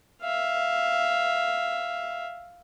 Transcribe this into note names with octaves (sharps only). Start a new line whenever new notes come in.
E5 F5